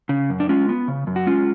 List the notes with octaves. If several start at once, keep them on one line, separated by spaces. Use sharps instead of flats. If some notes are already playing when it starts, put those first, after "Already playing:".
C#3
F#2
D4
G#3 C#4 F4
B3
C#3
F#2
F#4
G#3 C#4 F4